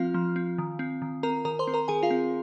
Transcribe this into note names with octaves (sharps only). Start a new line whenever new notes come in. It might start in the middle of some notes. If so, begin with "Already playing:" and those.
Already playing: F3 C4 F4 F5
F3
C4
D#3
C4
D#3
C4 A#4 A#5
D#3 A#4 A#5
C5 C6
C4
A#4 A#5
D#3 G#4 G#5
F4 F5
C4